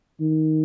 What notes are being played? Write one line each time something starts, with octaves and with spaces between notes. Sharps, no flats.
D#3